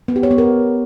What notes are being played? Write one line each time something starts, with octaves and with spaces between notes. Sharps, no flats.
B3
G4
C#5
B3
A#4